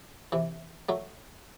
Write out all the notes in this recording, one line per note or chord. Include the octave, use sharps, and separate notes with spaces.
C3 E3
F#3 A3